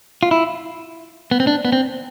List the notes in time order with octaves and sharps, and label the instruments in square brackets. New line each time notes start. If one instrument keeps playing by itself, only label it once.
[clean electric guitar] F4
E4
B3
C4
D4
B3
C4